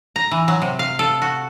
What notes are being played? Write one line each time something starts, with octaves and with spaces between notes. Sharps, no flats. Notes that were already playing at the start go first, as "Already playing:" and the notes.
A#5
E3
F#3
C3
F5
A4
F#4